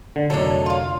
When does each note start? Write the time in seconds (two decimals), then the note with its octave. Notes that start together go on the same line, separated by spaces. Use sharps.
0.16 D3
0.30 F2 A2 C3 D#3 F#3 D4 A4
0.66 F4 F5